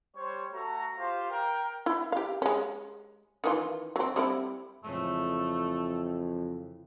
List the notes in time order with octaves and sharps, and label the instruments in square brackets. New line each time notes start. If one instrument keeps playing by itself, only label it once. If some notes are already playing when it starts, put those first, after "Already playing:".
[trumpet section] G3 C5 C#5
A3 F#4 A4 A#5
F4 G4 C5 F5
A#4 G5
[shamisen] E4
G4 F5
G#3 C#4
D#3 E3 F4
F#3 C4
G3 C4 E4
[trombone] F2 [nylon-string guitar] C#3 E3 G#3 [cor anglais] A3